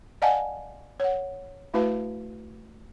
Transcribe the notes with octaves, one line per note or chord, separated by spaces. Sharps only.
D5 D#5 F5 F#5 G#5 A5
C#5 F#5
A3 E4 F#4 B4 F5 A5